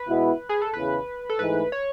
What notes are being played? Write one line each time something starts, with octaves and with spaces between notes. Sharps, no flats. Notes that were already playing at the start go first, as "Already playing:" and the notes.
Already playing: B4
B2 G#3 B3 E4
G#4
A4
E2 C#3 E3 B4
A4
G#2 E3 A3 D#4 B4
C#5